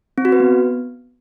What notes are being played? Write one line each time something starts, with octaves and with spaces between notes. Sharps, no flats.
C4
F#4
B4
B3